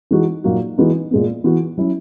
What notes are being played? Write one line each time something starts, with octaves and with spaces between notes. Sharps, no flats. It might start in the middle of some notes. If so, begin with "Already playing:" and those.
E3 G#3 D#4 F#4
A#2 F#3 A#3 D#4 F#4
E3 G#3 B3 D#4 F#4
A#2 G#3 B3
E3 B3 F#4
F#3 C#4 E4